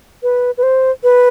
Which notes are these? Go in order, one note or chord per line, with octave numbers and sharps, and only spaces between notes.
B4
B4
C5
B4